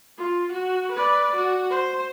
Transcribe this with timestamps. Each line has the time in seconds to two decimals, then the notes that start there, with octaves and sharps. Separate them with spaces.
0.18 F4
0.52 F#4
0.92 B4 D5
1.36 F#4
1.70 C5